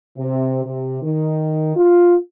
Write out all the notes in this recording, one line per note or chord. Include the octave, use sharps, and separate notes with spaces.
C3
C3
D#3
F4